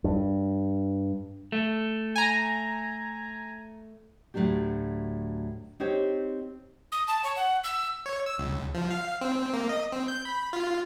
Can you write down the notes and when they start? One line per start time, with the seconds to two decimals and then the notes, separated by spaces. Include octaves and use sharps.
0.04 G2
1.52 A3
2.16 G#5 A#5
4.34 D2 A2 E3 F#3 D4 G4
5.80 C4 D#4 G4 C5 C#5
6.92 D#6
7.08 A5
7.24 C#5
7.36 F#5
7.64 E6
8.06 C#5
8.26 E6
8.38 C#2
8.75 F3
8.91 F5
9.21 C4
9.54 A#3
9.69 D#5
9.92 C4
10.08 G6
10.25 B5
10.53 F4